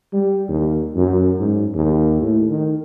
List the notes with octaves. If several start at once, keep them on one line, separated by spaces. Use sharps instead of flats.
G3
D#2
F#2
G#2
D#2
A2
D#3